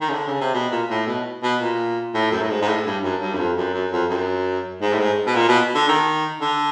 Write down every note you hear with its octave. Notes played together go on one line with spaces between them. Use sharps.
D#3
C#3
D3
C#3
C3
B2
A#2
A2
B2
B2
A#2
A2
F#2
A2
G#2
G#2
A2
G2
F#2
G2
F#2
F2
F#2
F#2
F2
F#2
G#2
A2
G#2
B2
A#2
B2
D3
D#3
D3